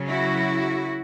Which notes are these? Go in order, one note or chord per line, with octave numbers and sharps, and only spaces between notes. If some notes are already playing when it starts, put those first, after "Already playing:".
Already playing: C#3 F#3
E4 F#4